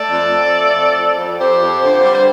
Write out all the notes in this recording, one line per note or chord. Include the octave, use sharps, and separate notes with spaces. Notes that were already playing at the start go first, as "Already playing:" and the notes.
Already playing: A3 A4 D5
F2
F2
A3
F2
F3
F2
F2 G4 C5
F2
D3
G3
C5